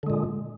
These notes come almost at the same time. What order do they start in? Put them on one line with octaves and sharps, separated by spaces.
D3 G#3 A#2